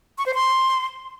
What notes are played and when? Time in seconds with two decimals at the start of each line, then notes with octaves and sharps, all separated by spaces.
0.18 C#6
0.26 C5
0.34 C6